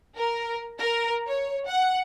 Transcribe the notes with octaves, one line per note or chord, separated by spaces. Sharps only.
A#4
A#4
C#5
F#5